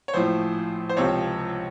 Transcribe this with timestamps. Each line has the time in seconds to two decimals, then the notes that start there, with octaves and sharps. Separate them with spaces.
0.08 C#5
0.14 A#1 A2 F3 C5
0.89 C5
0.97 C#2 C3 F3 C#5